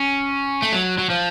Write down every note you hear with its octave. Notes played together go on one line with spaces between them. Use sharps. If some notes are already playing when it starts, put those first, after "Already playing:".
Already playing: C#4
A3
F#3
F#3
F3